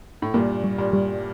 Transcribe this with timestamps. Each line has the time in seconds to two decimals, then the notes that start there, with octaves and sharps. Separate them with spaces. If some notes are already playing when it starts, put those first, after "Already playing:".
0.22 A2
0.34 G2 A#2 A#3
0.64 G3
0.78 G2 A#2
0.93 G3